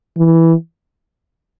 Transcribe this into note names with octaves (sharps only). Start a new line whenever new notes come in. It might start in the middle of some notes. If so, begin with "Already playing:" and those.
E3